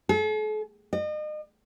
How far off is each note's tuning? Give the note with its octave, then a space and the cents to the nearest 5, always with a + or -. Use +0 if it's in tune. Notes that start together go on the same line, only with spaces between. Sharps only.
A4 -45
D#5 -40